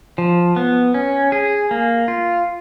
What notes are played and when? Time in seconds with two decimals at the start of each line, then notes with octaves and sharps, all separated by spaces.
0.18 F3
0.56 B3
0.94 C#4
1.32 G#4
1.71 A#3
2.08 F4